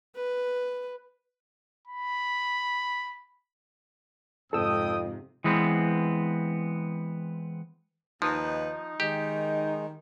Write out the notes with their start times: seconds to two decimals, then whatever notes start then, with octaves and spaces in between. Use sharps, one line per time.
0.15 B4
1.87 B5
4.53 F2 G#2 C3 A4 G5 D#6 E6
5.44 E3 G#3 B3 C4
8.22 D#2 F3 D#4 B4
9.00 D#3 G#3 G4